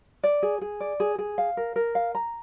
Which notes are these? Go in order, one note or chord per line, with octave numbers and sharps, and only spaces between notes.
D5
G#4
G#4
D5
G#4
G#4
F5
A#4
A#4
F5
A#5